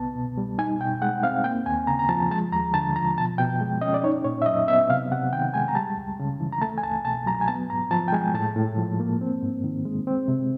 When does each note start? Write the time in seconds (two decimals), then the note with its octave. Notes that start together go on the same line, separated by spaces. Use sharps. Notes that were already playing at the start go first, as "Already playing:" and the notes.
Already playing: C2 B3 A5
0.15 B2
0.38 G3
0.58 D#4 G#5
0.80 B2 G5
1.02 G#3 F#5
1.23 C4 F5
1.44 A#3 G5
1.66 D#2 G#5
1.87 C#3 A#5
1.99 A#5
2.09 F3 A5
2.31 G#3 A5
2.53 D#2 A#5
2.74 D3 A5
2.96 F3 A#5
3.17 B2 A5
3.38 B2 G5
3.61 G#3
3.81 C#4 D#5
3.94 D5
4.04 D#4 C#5
4.24 A#2 C#5
4.42 E5
4.46 F#3 D#5
4.68 B3 E5
4.90 C3 F5
5.12 C3 F#5
5.32 D#3 G5
5.54 G#3 G#5
5.68 A#5
5.75 G3 A5
5.97 C#2
6.19 C#3
6.40 E3
6.53 A#5
6.62 A3 A5
6.78 G#5
6.83 C2 A5
7.05 B2 A5
7.26 F#3 A#5
7.41 G#5
7.48 B3 A5
7.70 G#2 A#5
7.91 F3 A5
8.08 G5
8.13 G#3 G#5
8.34 A2 A5
8.56 A2
8.77 F3
9.00 A#3
9.21 C4
9.43 G#2
9.64 D#3
9.85 G#3
10.07 C4
10.28 C3